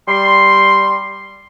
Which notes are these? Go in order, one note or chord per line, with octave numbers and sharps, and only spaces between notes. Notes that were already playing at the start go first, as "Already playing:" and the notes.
G3 C6